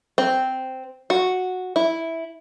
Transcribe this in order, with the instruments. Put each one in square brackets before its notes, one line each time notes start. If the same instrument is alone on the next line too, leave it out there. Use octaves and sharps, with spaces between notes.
[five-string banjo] C4
F#4
E4